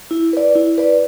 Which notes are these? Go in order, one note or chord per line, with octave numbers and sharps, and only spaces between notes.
E4
B4 D5
E4
B4 D5